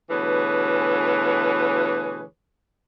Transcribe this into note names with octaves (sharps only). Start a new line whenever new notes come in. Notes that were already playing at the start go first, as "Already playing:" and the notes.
D2 B2 E3 G#4 B4 C#5